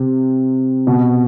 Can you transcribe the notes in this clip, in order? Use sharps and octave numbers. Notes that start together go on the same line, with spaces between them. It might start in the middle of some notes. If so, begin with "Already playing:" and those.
Already playing: C3
B2